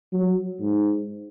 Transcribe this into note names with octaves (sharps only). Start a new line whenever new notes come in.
F#3
G#2